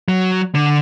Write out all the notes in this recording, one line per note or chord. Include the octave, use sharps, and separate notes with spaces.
F#3
D3